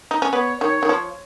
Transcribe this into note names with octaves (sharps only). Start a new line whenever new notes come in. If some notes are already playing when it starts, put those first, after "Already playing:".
D#4
C#4
B3 C#5
D#3 C#5
D#3
F3